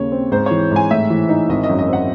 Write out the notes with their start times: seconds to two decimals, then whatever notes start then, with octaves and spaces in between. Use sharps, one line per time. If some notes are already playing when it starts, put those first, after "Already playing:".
Already playing: D#2 C#3 C#5
0.12 C4
0.32 G#2 C5
0.46 E3 C#5
0.71 G#2 G#5
0.91 A2 E5
1.10 E3
1.29 D#4
1.49 G#1 D#5
1.64 D#5
1.69 F#2
1.79 D#5
1.89 C4 F#5